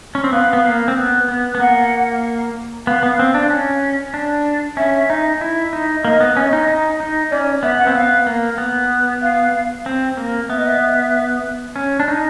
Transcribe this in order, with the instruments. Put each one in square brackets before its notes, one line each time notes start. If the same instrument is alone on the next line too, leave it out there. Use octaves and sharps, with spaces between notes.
[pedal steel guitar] C#4
C4
[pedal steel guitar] B3 [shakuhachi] F5
[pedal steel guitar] B3
A#3
C4
B3
B3
B3
[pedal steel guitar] A#3 [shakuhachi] F#5
[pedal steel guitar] B3 [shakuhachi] F5
[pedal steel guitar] B3
C4
D4
C#4
D4
[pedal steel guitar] C#4 [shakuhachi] E5
[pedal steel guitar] D#4
E4
D#4
[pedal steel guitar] A#3 [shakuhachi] D#5
[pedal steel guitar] B3
C#4
D#4
D#4
D#4
[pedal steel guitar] C#4 [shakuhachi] D5
[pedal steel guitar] B3 [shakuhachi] E5
[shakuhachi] F#5
[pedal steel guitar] C4
[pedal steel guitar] B3 [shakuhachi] F5
[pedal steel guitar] A#3
B3
[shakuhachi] F5
[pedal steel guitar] C4
A#3
[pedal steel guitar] B3 [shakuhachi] E5
[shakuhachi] D#5
E5
[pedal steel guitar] C#4
D4
D#4